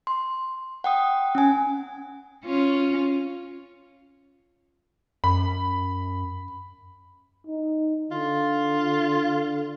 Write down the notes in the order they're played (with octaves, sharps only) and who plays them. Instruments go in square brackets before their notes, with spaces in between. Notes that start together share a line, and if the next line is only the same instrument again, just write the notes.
[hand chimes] C6
F#5 G5 D#6
C#4 G#5
[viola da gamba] C#4 F4
[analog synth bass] F#2 [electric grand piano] B5
[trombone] D#4
[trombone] D3 [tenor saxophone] F4